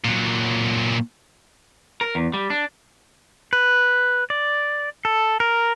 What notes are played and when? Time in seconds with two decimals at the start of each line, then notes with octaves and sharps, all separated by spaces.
0.05 A#2 F#3
2.01 A#4
2.15 E2
2.33 G3
2.50 D4
3.53 B4
4.30 D5
5.05 A4
5.40 A#4